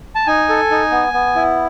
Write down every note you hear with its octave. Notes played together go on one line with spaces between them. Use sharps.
A5
D#4 G#5
A4
D#4
B3
B3
E4